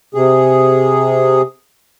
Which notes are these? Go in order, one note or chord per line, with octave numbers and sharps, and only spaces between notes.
C3 G#4